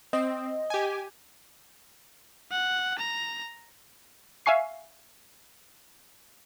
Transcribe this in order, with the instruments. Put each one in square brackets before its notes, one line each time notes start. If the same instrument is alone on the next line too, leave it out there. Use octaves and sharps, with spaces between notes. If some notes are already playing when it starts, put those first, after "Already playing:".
[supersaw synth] C4 [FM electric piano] D#5
[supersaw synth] G4 G#5
[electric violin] F#5
A#5
[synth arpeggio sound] E5 F5 G#5 C#6 C7